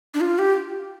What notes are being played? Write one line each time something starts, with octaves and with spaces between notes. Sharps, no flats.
D4
F4
G4